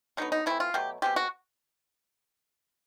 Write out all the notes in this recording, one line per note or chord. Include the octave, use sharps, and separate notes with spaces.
D3 F#3 B3 D#4
D#4
E3 A3 C4 E4
F4
B2 F#3 A3 G4
B2 G#3 C4 G4
F#4